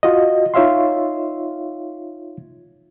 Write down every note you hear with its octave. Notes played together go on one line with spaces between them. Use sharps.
F4 F#4 D#5
D#4 F4 C#5 E5 F5 C6